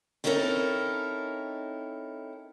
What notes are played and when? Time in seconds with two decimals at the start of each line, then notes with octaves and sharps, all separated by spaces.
0.24 C4 C#4 D#4 E4 A4 A#4